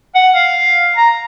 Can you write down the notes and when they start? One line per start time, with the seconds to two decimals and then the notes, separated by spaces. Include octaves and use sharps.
0.15 F#5
0.35 F5
0.96 A#5